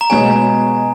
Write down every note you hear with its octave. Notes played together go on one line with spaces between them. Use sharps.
A#5
B2 G#3 B3 F#4 C#5 G#5